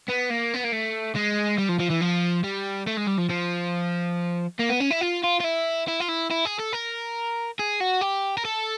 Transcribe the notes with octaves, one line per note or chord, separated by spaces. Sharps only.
B3
A#3
B3
A#3
A3
G#3
G3
F3
F3
E3
F3
G3
A3
G#3
G3
F3
F3
A#3
B3
C#4
E4
F4
F4
F4
E4
E4
F4
E4
E4
G#4
A4
A#4
G#4
F#4
G4
A#4
A4